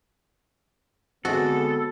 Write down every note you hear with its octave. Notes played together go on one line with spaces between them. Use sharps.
D3 G#3 B3 C4 F#4 A4 C5